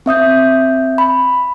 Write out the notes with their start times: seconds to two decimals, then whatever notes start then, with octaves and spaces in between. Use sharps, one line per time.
0.06 C4 E5 D#6 G6
0.98 B5